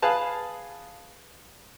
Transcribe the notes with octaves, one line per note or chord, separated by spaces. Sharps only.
G#4 B4 F5 A5